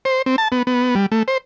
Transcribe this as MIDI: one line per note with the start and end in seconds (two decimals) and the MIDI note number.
0.05 0.22 72
0.26 0.36 60
0.38 0.48 81
0.52 0.63 59
0.67 0.95 59
0.95 1.06 55
1.12 1.23 57
1.28 1.38 72